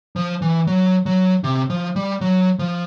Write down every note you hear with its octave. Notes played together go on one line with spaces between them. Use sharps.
F3
E3
F#3
F#3
C3
F3
G3
F#3
F3